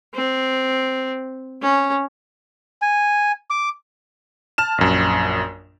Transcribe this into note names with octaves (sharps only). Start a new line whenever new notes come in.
C4
C#4
G#5
D6
A5 F6 E7
A#1 F#2